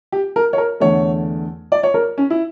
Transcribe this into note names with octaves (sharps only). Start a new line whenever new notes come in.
G4
A#4
C#5
A#4
E2 D3 A3 C#5
D5
C#5
A#4
C#4
E4